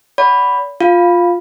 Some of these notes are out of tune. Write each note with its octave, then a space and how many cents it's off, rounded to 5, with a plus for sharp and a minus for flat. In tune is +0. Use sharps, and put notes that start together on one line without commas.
D5 -45 F#5 +0 B5 +5
F4 +10 F5 +0